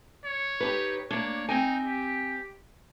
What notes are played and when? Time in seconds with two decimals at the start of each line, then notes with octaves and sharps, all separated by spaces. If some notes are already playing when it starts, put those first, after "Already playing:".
0.25 C#5
0.61 D#4 G4 B4
1.11 A#3 D4 C#5
1.49 C4 D#4 G5 G#5
1.84 G4